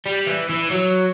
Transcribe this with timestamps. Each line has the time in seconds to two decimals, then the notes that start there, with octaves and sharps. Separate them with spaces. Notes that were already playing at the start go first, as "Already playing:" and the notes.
0.06 G3
0.27 E3
0.49 E3
0.71 F#3